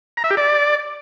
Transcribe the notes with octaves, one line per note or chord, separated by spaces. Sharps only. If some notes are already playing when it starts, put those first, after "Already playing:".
A#5
E5
G4
D5